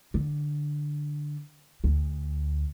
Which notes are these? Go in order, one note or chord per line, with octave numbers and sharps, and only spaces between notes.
D3
D2